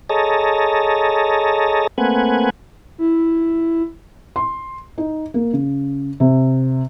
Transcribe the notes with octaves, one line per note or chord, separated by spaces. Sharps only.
G#4 A4 C#5 D#5 A5 A#5
A3 A#3 C4 B4 F#5 G#5
E4
C6
D#4
A#3
C#3
C3